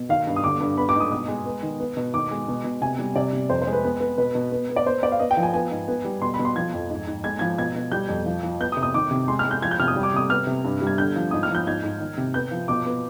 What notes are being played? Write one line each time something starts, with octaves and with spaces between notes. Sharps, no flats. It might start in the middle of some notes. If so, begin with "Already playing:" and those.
Already playing: B2
D#3 F5
G2
D#6
D3 D6
G2
B3 B5
D6
G#2
D#6
B2 D#6
G#3
B3
D#3
B3
B2
D#3 D6
G#3
B2
B2
C3 G#5
G3
C3 D5
C3
F2 C5
C5
G#3
B4
B3
B3
B2 B4
B2
B3
B3
D5
B3 C5
B3 D5
F5
B3 D#5
G5
F3
G#5
B3 G#5
G#2
B3
G3
B2 C6
B5
B2
C6
F3 G#6
F2
G#2
G#2
G#3 G#6
F3 G#6
B2 G#6
B2
G3 G6
F2
F3
F3
B3 G6
D#6
C3
D#6
D#3 D6
C3
G#3 C6
F6
G#3
G6
F3 G#6
G6
C3 F6
D#6
G3
D6
C3 D#6
B3 F6
C3
G2
G3
G#6
D3 G6
F3
G#2 D#6
F6
F3 G6
G#2 G#6
G#2
D#3
C3
B3 G6
F3
B2 D6
B3